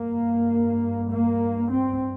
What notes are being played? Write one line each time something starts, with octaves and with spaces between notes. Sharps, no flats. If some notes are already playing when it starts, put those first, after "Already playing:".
Already playing: G2 A#3
A#3
C4